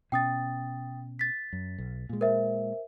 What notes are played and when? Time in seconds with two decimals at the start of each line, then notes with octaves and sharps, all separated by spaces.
0.12 B2 C#4 G5 D#6 A6
1.19 A6 B6
1.53 F#2
1.78 B1
2.09 A#2 G#3
2.21 A#4 C5 E5